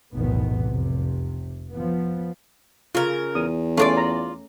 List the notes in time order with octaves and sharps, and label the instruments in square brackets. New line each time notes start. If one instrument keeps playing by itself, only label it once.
[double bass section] F1 B1 E2 A2 D#3 B3
F1 C3
F3 B3
[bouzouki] C#3 A#4 [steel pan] F4
[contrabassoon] E2 [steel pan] D#6
[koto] A3 [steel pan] C#4 C6 D6 [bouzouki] F4 F#4 D5
[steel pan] A#5